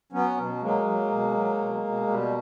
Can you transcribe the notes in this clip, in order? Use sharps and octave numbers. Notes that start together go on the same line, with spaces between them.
F#3 B3 C#4
B2
F#3 G#3 A#3
F#3
B2
F#3
B2
B2
B2 G3